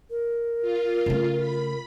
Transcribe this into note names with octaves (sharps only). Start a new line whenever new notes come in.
A#4
F4
C#3 A3
B5